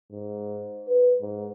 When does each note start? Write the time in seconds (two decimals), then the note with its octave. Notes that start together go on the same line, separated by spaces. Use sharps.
0.12 G#2
0.88 B4
1.22 G#2